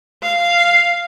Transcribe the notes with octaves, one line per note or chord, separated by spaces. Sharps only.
F5